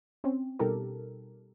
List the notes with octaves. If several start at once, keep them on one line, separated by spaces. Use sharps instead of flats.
C4 C#4
B2 G3 D#4 G4 A4 A#4